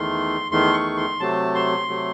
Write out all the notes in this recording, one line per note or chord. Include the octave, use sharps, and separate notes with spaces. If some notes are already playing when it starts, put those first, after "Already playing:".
Already playing: E2 D#3 A3 C6
E2 D#3 A3 C6
C#6
C6
C3 F#3 A3 A5
C6
C3 F#3 A3